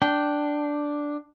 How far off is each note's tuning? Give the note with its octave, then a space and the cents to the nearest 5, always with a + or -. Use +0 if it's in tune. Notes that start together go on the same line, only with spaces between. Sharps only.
D4 +0 G5 -10